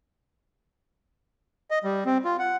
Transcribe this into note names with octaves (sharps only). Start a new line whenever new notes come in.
D#5
G3
C4
F4
F#5